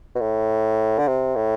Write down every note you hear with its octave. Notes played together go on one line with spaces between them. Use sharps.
B2
A2
D3
C3
A2